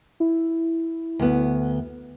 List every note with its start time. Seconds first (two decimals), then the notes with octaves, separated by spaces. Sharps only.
0.20 E4
1.19 D2 B3